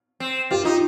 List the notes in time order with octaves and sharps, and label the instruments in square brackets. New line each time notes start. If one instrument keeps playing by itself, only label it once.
[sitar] C4
[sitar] F4 [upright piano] G4
[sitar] D#4 [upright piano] F4